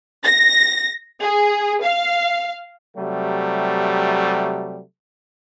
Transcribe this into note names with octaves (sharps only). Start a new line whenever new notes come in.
A#6
G#4
F5
C3 F#3 G3 A3